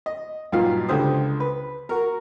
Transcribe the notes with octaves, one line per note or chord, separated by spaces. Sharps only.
D#5
G2 A#2 F#3 D#4 F4 F5
C#2 D3 G4 C5 D#6
B4
F#4 A#4